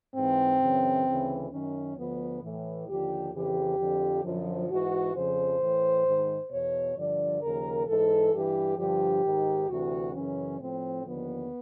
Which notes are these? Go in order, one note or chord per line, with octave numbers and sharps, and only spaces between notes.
G#2 E3 C4
F#2 C#3 E3
D2 C#3 E3
F#2 D#3 C#4
D2 D3 F3 B3
A2 E3
D#2 D3 F3 G4
F2 C#3 E3 G4
F2 D3 F3
F#2 D3 F3
G#2 E3 F#4
F2 C#3 F3 C5
A2 E3
G#2 D#3
E2 B2 C#5
G2 D3 F3 D5
D#2 C#3 F3 A#4
G#2 E3 A4
G2 E3 G4
G2 D3 F3 G4
G#2 D#3
D2 C3 E3 F#4
F#2 C#3 E3 C#4
A2 F3 C4
D#2 D3 F3 B3